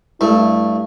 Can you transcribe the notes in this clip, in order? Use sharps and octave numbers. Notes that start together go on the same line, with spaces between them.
G2 A3 E4